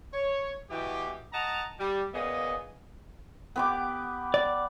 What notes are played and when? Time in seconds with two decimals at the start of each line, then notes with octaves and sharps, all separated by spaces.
0.13 C#5
0.70 B2 E3 G4
1.33 D#5 F#5 A5 A#5
1.79 G3
2.14 A#2 C#3 B3 G#4 D#5
3.56 B3 G4 D6
4.34 D5